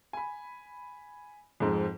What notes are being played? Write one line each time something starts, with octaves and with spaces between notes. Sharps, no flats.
G#5 B5
F2 G#2 G#3